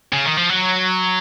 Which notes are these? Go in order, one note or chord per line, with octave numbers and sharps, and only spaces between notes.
C#3
D#3
F3
F#3